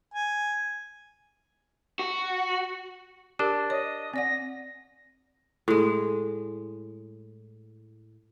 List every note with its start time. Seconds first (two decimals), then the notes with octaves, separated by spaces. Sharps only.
0.14 G#5
1.99 F#4
3.39 D4 G4 A#4
3.70 C#5 D#5
4.14 C4 D5 F#5 A#6
5.68 A2 G#3